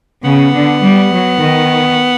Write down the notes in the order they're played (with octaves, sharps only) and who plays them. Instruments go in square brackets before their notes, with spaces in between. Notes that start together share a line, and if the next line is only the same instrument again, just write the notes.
[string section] C#3 [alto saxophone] B3
[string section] D3
G3
F#3
D#3